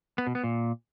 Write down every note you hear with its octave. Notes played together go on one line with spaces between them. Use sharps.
B3
B2
B3
A#2